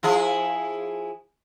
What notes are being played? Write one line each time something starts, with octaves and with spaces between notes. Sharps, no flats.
F3 E4 G#4